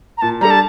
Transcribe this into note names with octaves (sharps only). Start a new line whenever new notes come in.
A#5
A#2 A5
G3 D4 A4 A#5
A5